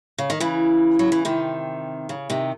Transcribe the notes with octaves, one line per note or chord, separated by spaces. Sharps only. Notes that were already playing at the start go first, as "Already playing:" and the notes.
C#3
D#3
C#3 E3
F#3
E3
C3 D#3
C#3
C3 D#3